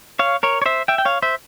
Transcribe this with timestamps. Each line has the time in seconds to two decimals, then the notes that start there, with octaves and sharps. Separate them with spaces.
0.19 C#5 F5
0.43 A#4 C#5
0.62 C#5
0.66 C5 E5
0.88 E5 G5
0.98 G5
1.05 C#5 F5
1.22 C5 E5